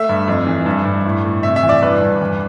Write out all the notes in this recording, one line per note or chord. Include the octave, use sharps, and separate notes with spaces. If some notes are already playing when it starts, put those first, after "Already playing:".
Already playing: A3 E5
G2
F2
E3
G2
G2
A2
A2
C3 E5
E5
E2
D5
G2 B4
G2
E2